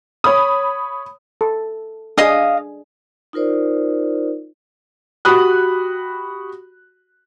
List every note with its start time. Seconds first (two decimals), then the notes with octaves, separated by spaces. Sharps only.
0.24 C#5 B5 D#6
1.41 A4
2.18 D4 G#4 D#5 F5 D#6
3.33 D#4 F4 A#4 C5 D5
5.25 F#4 G4 B5 D#6 F#6